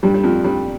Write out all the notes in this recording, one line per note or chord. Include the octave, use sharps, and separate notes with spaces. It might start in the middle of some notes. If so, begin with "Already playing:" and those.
G2 G3
G3
F2 F3
G2 G3